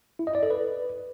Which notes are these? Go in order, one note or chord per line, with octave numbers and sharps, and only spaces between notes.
E4
D#5
D5
A4
B4